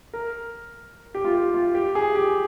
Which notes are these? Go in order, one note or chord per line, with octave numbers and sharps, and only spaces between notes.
A#4
G4
F4
G4
F4
G4
G#4
G4